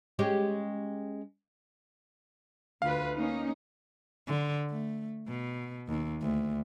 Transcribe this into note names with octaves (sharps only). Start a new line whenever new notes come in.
G#3 C#4 G4
D2 F4 B4 F5
A#3 C#4 D#4
D3
A3
B2
D#2
D2